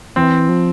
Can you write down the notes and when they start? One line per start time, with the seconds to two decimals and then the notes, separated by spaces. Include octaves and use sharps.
0.16 E3 C4
0.49 F3